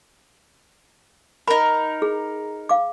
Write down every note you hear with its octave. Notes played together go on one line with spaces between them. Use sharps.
D#4 A#4 B5
G#4
F5 D6